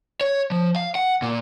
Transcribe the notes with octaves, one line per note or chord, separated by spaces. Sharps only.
C#5
F3
F5
F#5
A#2